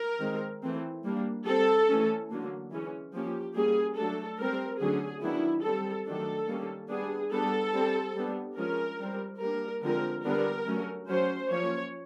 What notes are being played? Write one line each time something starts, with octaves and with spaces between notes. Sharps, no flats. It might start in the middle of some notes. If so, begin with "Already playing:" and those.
Already playing: A#4
D#3 G#3 C4
E3 A3 C4
G3 A#3 D4
G3 C4 A4
E3 A3 C#4
D3 F#3 A#3
E3 G#3 C#4
F3 A#3 C#4 G4
G3 A#3 C#4 G#4
F#3 A3 D4 A4
G3 C4 A#4
D3 F#3 A3 C#4 G#4
D#3 F#3 B3 D4 E4
G3 C4 A4
D#3 F#3 A3 D4 A4
D#3 G3 A#3 C#4
G3 B3 D4 G#4
G3 B3 D4 A4
G3 C4
G3 B3 D4
F3 G#3 C#4 A#4
G3 C4
G3 A#3 D4 A#4
D3 F3 G#3 C4 A#4
D3 G3 B3 D4 A#4
F#3 A3 C#4
F#3 A3 C#4 C5
F3 A#3 C#4 C#5